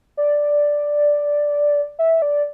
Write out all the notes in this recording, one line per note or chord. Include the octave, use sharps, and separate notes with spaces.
D5
E5
D5